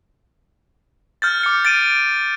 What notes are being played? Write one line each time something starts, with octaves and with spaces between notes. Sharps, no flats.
F6 G6 A6
D6 C#7
A6 D7 D#7